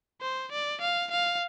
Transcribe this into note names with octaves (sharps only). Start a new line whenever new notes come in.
C5
D5
F5
F5